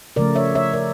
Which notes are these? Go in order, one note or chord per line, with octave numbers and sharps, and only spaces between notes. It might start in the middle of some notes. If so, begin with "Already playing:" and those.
C#3 F3 A3 A#4 D5
C#5 E5
C#5 E5
A#4 D5